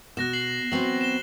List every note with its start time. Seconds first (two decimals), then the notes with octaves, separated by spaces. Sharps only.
0.17 B2 F#6 A#6 E7
0.33 C7 F#7
0.72 F#3 B3 C4 F#7
1.01 E7 G7